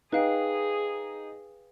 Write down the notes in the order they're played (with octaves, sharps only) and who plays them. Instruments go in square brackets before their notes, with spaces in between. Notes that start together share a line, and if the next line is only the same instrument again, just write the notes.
[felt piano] D#4 [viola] G#4 [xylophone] B4 F5 G5